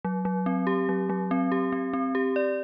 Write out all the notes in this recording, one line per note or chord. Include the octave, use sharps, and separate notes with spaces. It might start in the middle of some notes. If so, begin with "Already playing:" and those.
F#3
F#3
C4
G4
F#3
F#3
C4
G4
C4
C4
G4
D5